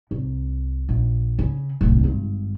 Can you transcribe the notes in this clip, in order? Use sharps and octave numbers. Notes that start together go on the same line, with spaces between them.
C2
A#1
C#3
D1 C2
G#1 G2